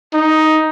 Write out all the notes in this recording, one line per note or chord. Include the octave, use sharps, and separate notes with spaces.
D#4